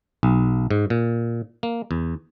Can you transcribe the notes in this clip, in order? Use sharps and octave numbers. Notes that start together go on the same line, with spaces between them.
B1
G#2
A#2
A#3
E2